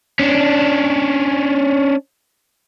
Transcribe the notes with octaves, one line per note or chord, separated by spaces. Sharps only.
C#4 D4